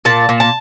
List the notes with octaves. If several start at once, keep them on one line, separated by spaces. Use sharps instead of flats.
A#2 A5
A#2
A5